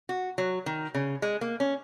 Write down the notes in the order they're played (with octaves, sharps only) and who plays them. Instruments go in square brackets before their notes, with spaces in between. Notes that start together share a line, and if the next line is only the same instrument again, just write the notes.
[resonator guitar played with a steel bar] F#4
F#3
D#3
C#3
G#3
A#3
C#4